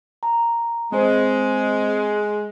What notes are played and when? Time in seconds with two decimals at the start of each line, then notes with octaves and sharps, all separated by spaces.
0.23 A#5
0.92 G#3 C4 C5